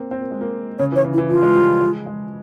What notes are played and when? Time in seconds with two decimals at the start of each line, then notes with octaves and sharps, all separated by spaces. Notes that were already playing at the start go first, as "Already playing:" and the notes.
Already playing: A#3 C4
0.11 C4
0.21 A#3
0.31 G#3
0.41 A#3
0.79 C#3 C#5
0.92 E3 C#5
1.05 C#3
1.13 E4
1.18 E3
1.29 F3 F4
1.42 G#3
1.55 G3
1.68 F3
1.81 G#3
2.06 G#3